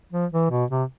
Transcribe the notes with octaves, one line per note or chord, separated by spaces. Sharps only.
F3
E3
B2
C3